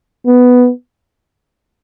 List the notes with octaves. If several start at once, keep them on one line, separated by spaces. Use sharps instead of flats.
B3